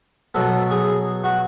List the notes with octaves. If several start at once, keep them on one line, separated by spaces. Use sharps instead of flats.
B2 F#3 B3 A4
G#4
F#4